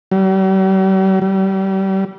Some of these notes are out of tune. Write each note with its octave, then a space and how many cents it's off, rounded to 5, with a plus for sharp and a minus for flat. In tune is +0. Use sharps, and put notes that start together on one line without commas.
G3 -45
G3 -30